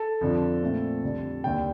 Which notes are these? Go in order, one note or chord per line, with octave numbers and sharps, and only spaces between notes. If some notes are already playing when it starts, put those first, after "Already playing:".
Already playing: A4
F2 D3 F3
A#2 A3 C4
F2 D3 G3
D#2 D3 G3 G5